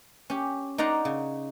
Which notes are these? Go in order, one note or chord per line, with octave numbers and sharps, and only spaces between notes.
C#4 G4
D#4 D5 F#5 A#5 C6
C#3